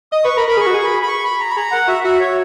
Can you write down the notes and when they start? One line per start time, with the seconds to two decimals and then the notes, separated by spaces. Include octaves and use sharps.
0.12 D#5 D#6
0.24 B4 C#6
0.37 A#4 B5
0.48 A#4 B5
0.57 G#4 C#6
0.66 F#4
0.74 G#4
0.84 B5
1.03 B5
1.08 C#6
1.24 B5
1.40 A#5
1.50 B5
1.56 G#4 A#5
1.72 A#4 F#5
1.87 F#4 E5
2.04 F#4 E5
2.20 C#5